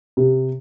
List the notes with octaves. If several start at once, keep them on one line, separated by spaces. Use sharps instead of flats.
C3